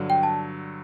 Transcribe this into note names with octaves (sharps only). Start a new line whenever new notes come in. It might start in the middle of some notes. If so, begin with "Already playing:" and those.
Already playing: G2 D3 F#3
G5
A5